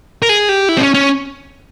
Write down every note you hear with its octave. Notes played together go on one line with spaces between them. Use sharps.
A#4
G#4
G4
E4
C4
C#4
C#4